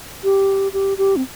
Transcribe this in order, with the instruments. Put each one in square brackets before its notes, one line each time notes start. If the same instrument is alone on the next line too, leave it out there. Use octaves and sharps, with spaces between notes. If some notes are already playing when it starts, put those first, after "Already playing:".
[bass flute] G4
G4
G4
C4